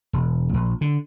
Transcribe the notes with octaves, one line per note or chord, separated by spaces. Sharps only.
E1
A#1
D3